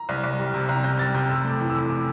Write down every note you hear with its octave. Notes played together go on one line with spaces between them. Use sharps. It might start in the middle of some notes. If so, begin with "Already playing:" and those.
Already playing: A#5
C2
C2
G3
C3
C2 A#5
C2 G6
G3 A6
C3 G6
F1 E6
A3
D6
E3
E6
E2
D6